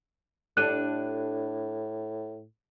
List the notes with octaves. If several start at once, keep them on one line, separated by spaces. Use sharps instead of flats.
A2 D4 G4 A4 F#6 D#7